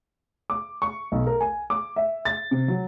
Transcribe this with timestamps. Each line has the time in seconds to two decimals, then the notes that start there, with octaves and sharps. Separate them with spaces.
0.50 D6
0.82 C#6
1.12 B1
1.27 A#4
1.41 G#5
1.70 D6
1.96 E5
2.25 A6
2.51 C3
2.68 F#3